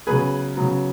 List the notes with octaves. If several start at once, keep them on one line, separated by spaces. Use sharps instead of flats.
C#3 F#3 B3 G#4 B4
C#3 F#3 B3